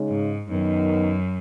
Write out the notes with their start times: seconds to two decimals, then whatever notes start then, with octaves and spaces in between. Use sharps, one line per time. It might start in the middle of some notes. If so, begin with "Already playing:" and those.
Already playing: C#3 G#3 D#4
0.09 G#2
0.49 F#2 D#3 B3 D#4